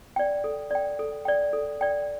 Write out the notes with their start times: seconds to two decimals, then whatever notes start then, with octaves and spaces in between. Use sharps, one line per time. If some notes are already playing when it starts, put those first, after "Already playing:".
0.16 D5 G5
0.44 A4
0.71 D5 G5
0.99 A4
1.25 D5 G5
1.53 A4
1.81 D5 G5